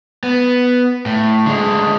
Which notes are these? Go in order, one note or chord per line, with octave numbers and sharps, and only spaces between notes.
B3
A2
D3 G#3